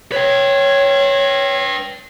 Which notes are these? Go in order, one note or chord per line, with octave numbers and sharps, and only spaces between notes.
B4 C#5 G5